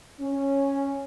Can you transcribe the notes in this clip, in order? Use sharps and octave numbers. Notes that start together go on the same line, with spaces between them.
C#4